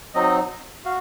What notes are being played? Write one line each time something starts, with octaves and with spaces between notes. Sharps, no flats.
F#3 C4 D#4 D#5
F#4 F5